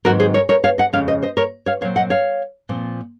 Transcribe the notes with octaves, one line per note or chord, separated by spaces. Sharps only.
G#2 D#3 F#3 C4 F#4 A#4
G#4 C5
A#4 C#5
A#4 C#5
C#5 F5
D#5 F#5
F2 C#3 G#3 C#5 F5
C5 D#5
C5 D#5
A#4 C#5
C#5 F5
A#2 F#3 C4 C#5 F5
D#5 F#5
C#5 F5
A#2 F3 C4